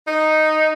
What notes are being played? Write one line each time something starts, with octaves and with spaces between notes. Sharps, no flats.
D#4